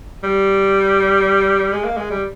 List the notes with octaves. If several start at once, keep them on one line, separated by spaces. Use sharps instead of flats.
G3
G#3
A#3
G#3
G3